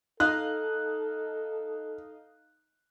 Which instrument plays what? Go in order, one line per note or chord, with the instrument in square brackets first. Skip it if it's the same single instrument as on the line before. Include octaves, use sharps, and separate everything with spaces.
[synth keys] D#4 D#5 F5 [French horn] A4 [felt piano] F#6